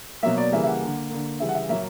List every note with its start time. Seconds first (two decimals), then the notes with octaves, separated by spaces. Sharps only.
0.23 B2 F#3 A#3 E5
0.38 D5
0.52 C#3 E3 G3 A#3 E5
0.64 E5
0.67 F#5
0.82 D3 A#3
1.10 D3 A#3
1.40 C#3 E3 G3 E5
1.49 F#5
1.55 E5
1.69 A#2 F#3 A#3 E5